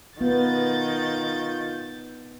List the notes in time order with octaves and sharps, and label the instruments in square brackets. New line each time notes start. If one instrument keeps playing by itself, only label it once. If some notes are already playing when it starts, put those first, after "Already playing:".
[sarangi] D#3 [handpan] B3 [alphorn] F4 [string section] G6 A6